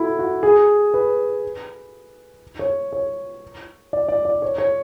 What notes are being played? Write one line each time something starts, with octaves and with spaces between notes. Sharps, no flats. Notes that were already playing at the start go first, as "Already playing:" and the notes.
Already playing: E4 F#4 A4
F#4
G#4
B4
C#5
C#5
D5
D5
D5
C#5
C#5